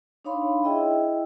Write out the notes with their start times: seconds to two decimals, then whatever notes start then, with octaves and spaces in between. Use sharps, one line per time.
0.25 D4 D#4 C#5 F5 B5 C6
0.63 E4 G#4 D#5 E5 G5